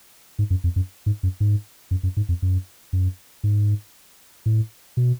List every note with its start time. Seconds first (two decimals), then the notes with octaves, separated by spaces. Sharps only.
0.39 G#2
0.50 F#2
0.64 F2
0.76 F#2
1.06 G#2
1.23 F#2
1.40 G#2
1.91 F#2
2.03 F#2
2.17 G#2
2.29 F2
2.42 F#2
2.93 F#2
3.44 G#2
4.46 A2
4.97 B2